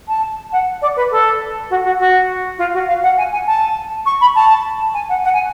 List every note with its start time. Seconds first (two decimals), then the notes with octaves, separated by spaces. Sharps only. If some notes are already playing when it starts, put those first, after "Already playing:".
0.08 A5
0.52 F#5
0.82 D5
0.96 B4
1.11 A4
1.70 F#4
1.84 F#4
2.00 F#4
2.58 F4
2.74 F#4
2.88 F5
3.03 F#5
3.18 G#5
3.32 G#5
3.47 A5
4.06 C#6
4.21 B5
4.35 A5
4.94 G#5
5.09 F#5
5.24 F#5
5.34 G#5